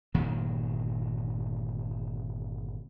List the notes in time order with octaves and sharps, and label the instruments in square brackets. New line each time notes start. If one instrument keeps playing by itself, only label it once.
[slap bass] G1 A#2 D#3 F#3